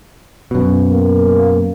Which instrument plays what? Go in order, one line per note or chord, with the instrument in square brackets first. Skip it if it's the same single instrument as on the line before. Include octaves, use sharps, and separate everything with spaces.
[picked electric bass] F#2 B2
[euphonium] A#3